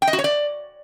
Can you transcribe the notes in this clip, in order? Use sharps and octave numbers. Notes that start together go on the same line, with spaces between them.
G5
D#5
F#4
C#5
D5